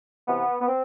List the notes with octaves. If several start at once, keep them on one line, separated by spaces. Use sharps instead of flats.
C3 E3 B3
B3
C4